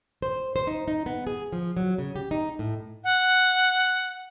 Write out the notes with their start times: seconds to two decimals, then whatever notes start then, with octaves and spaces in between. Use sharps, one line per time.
0.22 C5
0.56 C5
0.67 D#4
0.88 D#4
1.06 B3
1.27 G#4
1.53 F3
1.77 F#3
1.98 C#3
2.16 G4
2.31 D#4
2.59 A2
3.04 F#5